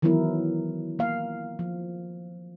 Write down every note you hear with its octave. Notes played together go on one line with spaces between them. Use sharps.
D#3 E3 F#3 B3 E4 A#4
A#3 F5
F3